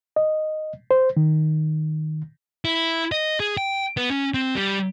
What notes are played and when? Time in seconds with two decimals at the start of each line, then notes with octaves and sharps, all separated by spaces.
0.16 D#5
0.91 C5
1.17 D#3
2.65 E4
3.12 D#5
3.40 G#4
3.57 G5
3.97 B3
4.10 C#4
4.34 C4
4.55 G3